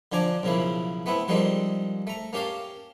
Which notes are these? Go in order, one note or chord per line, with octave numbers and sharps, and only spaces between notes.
D3 F3 D4 G#5 A#5 D6
B1 C#3 F3 A#3 E4
A3 B3 C4 E4
F3 G3 G#3 A#3 C4 D#4
A3 A#5
A#3 C#4 G4 F5 A5